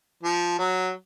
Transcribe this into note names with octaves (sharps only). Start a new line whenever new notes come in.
F3
F#3